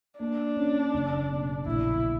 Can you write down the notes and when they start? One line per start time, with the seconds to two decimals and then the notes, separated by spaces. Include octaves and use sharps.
0.20 A#3 D4
0.56 C#4
0.94 F#1
1.29 B2
1.66 A#1 E4